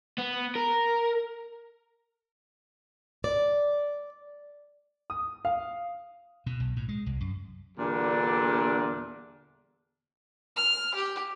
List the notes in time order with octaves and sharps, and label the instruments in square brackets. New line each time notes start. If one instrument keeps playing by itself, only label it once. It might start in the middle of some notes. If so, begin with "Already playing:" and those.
[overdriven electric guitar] B3
A#4
[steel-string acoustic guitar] D5
[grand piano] D#6
F5
[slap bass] B2
B1
A2
G#3
C2
F#2
[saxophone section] E2 A#2 D3 G3 D4
[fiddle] F6
G4